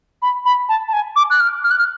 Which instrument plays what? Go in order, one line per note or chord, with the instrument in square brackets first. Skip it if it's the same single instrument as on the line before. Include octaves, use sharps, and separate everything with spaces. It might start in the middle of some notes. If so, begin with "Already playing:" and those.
[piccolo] B5
B5
A5
A5
G#5
D6
F#6
F6
F6
F#6
F6